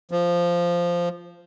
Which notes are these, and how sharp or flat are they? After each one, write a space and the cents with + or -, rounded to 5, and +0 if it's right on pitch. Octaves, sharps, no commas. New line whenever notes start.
F3 -5